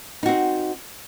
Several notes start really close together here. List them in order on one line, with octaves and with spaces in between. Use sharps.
D#4 F#4 C4